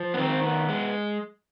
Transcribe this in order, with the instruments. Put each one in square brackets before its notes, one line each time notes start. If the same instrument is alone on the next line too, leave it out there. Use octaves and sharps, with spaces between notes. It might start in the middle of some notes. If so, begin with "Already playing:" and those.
Already playing: [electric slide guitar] F3
B3
D#3 C4
B3
G#3